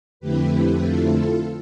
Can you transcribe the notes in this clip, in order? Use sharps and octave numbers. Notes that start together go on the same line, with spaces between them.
F2 D3 A3 C4 E4 G4 B4
F4 A4